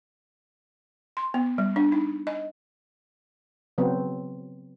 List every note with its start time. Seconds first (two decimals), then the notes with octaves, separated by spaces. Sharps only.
1.17 C6
1.34 B3
1.58 G3
1.76 D4
1.92 D#4
2.27 D#5
3.78 C#3 F#3 B3 C4